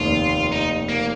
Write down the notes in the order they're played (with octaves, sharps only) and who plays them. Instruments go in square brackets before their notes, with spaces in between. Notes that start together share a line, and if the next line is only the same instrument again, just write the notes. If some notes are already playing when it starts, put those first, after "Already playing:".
Already playing: [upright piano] F1 D#2 D#3 [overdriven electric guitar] F4
[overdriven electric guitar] D#4
A#3